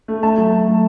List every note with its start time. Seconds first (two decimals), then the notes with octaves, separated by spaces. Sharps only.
0.08 A3
0.23 A3 A5
0.38 F#3
0.53 A3
0.68 A3